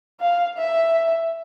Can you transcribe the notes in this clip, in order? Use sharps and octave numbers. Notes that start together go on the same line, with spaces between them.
F5
E5